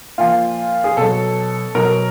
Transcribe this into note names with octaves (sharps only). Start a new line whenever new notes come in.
A#2 F3 F4
G#4
B2 F#3 A4
B2 F#3 A#4